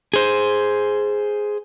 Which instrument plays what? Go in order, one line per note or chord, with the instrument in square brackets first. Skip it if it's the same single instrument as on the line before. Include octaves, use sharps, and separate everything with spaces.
[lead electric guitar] G#4 C5